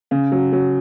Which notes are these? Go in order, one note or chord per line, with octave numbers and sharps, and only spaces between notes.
C#3
F#3
F#3